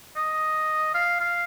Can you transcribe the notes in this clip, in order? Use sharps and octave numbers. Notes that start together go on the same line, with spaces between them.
D#5
F5
F5